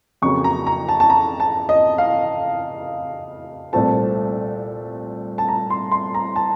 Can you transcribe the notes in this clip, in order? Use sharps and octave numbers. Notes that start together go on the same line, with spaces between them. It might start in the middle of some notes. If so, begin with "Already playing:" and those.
F2 C#3 F#3 A#3 C#6
A#5
A#5
A5
A5
A#5
A5
D#5
F5
C2 A#2 A3 C4 A5
A5
A#5
C6
C6
A#5
A5